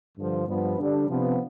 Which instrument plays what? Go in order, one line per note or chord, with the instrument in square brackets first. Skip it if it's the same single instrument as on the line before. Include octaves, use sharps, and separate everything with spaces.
[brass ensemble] G2 D3 F3
G2 F3 B3
D3 G3 D4
C3 F3 B3